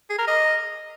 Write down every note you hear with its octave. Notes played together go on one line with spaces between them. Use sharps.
G#4
A#4
D#5